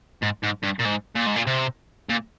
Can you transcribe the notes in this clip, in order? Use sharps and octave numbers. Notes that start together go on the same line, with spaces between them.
G#2
G#2
G2
A#2
G#2
A#2
G#2
A#2
C3
A#2